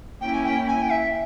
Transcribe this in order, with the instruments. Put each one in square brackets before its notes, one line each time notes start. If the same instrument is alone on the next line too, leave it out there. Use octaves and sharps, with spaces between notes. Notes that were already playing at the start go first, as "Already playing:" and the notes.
[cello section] A#3 C#4 E4 [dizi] G5
[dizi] G#5
G5
G#5
G5
E5